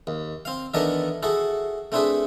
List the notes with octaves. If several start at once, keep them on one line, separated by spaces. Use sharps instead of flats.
D#2
C4 F5
D#3 E3 B3 D4 A4 A#4
E4 F#4 G#4 A4
A3 C4 D4 E4 G#4 B4